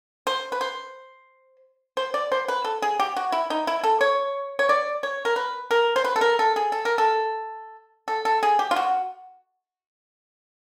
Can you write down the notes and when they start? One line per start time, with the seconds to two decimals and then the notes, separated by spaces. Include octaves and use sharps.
0.27 C5
0.52 B4
0.61 C5
1.97 C5
2.14 D5
2.32 C5
2.48 B4
2.64 A4
2.82 G#4
2.99 G4
3.16 F#4
3.32 E4
3.50 D#4
3.67 E4
3.84 A4
4.01 C#5
4.59 C#5
4.69 D5
5.03 C#5
5.25 A#4
5.36 B4
5.71 A#4
5.96 C5
6.04 B4
6.16 A4
6.21 A#4
6.39 A4
6.56 G#4
6.72 A4
6.85 A#4
6.98 A4
8.08 A4
8.25 A4
8.43 G#4
8.59 G4
8.71 F4
8.76 F#4